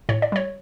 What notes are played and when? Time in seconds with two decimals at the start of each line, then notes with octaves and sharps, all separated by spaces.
0.09 A2 C#5
0.22 D5
0.32 G3 C#5